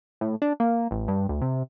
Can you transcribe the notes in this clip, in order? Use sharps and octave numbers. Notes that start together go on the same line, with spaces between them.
A2
D4
A#3
A1
G2
D2
C3